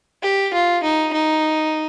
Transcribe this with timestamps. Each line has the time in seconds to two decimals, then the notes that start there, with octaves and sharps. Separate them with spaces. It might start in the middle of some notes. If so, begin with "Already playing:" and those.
0.23 G4
0.54 F4
0.83 D#4
1.13 D#4